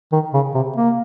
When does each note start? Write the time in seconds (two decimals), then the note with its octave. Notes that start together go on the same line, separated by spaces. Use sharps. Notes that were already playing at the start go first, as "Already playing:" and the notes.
0.12 D#3
0.34 C#3
0.55 C3
0.76 A#3